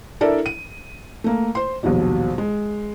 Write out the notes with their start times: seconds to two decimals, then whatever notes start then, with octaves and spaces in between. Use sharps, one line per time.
0.21 D4 E4 A4 A#4 D5 E5
0.46 D#7
1.24 A3 A#3
1.55 C5 C6
1.83 A#1 D#2 B2 F#3 G3
2.38 G#3